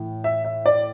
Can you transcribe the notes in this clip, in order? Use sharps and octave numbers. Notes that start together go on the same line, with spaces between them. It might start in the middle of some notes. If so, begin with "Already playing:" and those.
Already playing: A2 E3
E5
E5
D5